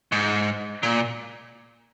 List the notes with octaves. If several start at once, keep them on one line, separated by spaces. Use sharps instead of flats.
G#2
A#2